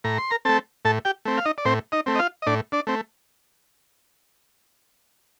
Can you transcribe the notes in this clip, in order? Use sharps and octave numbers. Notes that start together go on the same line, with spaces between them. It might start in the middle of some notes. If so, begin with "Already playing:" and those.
A2 A#5
C6
A#4 A#5
A3 C4 A4 A5
A2 A4 A5
G4 G5
A3 C4
F5
D#4 D#5
D5
A2 C4 C5
D#4 D#5
A3 C4
D#5
F4 F5
D#5
A2 D4 D5
D4 D5
A3 C4